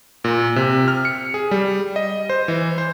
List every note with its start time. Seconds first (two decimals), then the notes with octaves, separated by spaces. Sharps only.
0.24 A#2
0.56 C3
0.88 F6
1.05 C#7
1.34 G#4
1.51 G3
1.96 D#5
2.29 C5
2.48 E3
2.78 C5